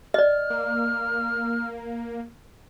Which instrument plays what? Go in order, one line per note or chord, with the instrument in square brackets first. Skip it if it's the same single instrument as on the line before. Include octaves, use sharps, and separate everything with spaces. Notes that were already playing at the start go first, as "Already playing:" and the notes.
[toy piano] D5 D#5 [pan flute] F6
[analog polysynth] A#3